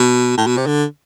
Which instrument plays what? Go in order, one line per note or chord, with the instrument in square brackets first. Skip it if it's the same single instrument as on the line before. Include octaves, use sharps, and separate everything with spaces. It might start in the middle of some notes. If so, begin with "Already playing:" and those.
Already playing: [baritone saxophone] B2
A2
B2
C3
D3